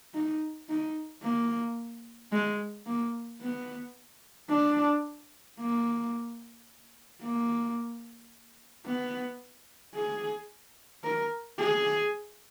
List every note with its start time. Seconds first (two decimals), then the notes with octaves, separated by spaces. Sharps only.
0.14 D#4
0.69 D#4
1.23 A#3
2.32 G#3
2.86 A#3
3.41 B3
4.49 D4
5.60 A#3
7.22 A#3
8.86 B3
9.95 G#4
11.04 A#4
11.59 G#4